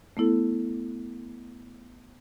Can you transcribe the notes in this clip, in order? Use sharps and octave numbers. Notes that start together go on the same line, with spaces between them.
A3 B3 E4 A4